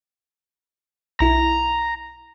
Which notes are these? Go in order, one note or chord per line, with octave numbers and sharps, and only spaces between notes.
B1 E4 A#5